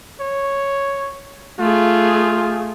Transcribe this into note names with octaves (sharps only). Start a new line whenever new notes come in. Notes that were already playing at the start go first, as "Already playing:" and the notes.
C#5
A3 F4 G#4